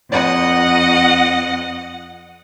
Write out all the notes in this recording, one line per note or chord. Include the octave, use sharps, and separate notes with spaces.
F2 D#5 F#5